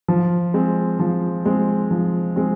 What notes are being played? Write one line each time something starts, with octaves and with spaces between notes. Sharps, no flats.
F3
G#3 C4
F3
G#3 C4
F3
G#3 C4